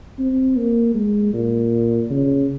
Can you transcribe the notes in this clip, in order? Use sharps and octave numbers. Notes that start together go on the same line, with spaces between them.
C4
A#3
G#3
A#2
C#3